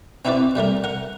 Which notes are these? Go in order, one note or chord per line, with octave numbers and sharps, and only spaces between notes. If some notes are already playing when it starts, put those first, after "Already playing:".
C4 D#4 E4 F#4 B4 D5
C3 G3 A3 A#4
A#4 F#5